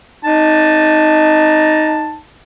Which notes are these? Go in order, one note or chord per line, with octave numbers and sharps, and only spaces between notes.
D#4 A5